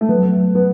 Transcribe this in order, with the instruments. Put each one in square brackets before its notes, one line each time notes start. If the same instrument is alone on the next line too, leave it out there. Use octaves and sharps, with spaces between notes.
[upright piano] A3
[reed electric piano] F#3 [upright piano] B3
[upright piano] B3